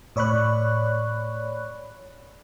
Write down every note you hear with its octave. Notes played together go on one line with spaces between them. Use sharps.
A2 C#5 D5 B5 C#6 F#6